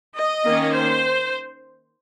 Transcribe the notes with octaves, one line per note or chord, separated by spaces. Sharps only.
D#5
D#3 A#3 C#4
C5